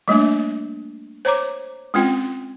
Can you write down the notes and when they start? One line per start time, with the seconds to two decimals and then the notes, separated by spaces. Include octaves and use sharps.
0.08 G3 A3 A#3 D4
1.25 C5 C#5 A#5 D6
1.94 G#3 C4 C#4 F4 G5